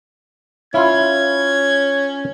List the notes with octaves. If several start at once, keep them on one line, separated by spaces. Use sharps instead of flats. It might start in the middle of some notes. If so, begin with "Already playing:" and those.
C#4 E4 F4 G#6